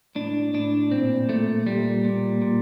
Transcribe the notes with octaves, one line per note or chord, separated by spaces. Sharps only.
A2 D4
A2 D4
A#2 C4
A#2 A3
A#2 G3
A#2
A#2